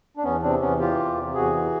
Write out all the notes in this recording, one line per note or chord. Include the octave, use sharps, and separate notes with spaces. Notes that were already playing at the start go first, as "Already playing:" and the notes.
D4
E2 B3 C#4
C3 C4 D4
E2 B3 C#4
E3 F4 G4
E2
C3
E2 F#4 G#4
E3